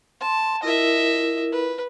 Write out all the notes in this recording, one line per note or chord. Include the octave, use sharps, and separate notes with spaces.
A5 C6
E4 F4 A#4 D#5 E5
B4